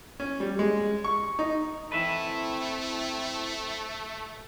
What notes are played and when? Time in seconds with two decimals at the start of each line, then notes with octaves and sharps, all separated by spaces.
0.20 C#4
0.40 G3
0.59 G#3
1.04 C#6
1.39 D#4
1.92 A3 C4 E4 B4 E5